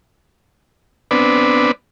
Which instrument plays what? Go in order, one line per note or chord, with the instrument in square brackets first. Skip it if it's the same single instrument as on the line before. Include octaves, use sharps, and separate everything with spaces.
[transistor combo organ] B3 C4 D4 B4 D5